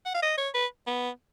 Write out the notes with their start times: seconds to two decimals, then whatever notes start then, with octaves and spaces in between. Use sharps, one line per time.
0.06 F#5
0.14 F5
0.22 D#5
0.38 C#5
0.54 B4
0.87 B3